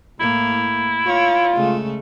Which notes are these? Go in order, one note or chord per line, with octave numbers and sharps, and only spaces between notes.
A2 A#3 E4
F4 C#5
C#3 G#3 A3